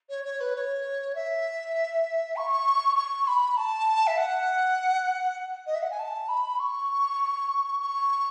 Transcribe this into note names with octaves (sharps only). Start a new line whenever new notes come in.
C#5
C#5
B4
C#5
E5
C#6
C#6
B5
A5
E5
F#5
D#5
E5
F#5
G#5
A5
B5
C#6
C#6